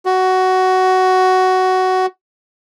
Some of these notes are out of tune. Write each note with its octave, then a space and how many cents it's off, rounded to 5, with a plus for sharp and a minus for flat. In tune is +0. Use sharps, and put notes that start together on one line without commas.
F#4 +10